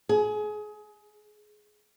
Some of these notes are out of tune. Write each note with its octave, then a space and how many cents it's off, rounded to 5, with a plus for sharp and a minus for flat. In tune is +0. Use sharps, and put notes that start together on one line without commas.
G#4 +25